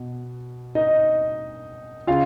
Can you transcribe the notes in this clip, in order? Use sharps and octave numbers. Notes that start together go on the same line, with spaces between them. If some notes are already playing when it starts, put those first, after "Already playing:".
Already playing: B2
D#4 D#5
C#3 F4 F5